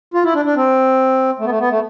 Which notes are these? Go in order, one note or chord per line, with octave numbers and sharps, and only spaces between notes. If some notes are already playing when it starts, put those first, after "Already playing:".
F4
E4
D4
D4
C4
A3
B3
A3
B3
A3